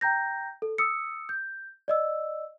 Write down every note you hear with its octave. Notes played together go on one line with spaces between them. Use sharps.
G5 A#5 G6 A#6
A4
D#6 E6 C#7
G6
D5 D#5 E6